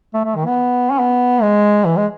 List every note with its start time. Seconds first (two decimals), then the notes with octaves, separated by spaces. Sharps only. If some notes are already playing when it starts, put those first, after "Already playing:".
0.14 A3
0.25 A3
0.36 D#3
0.46 B3
0.92 C#4
1.00 B3
1.42 G#3
1.85 E3
1.97 G#3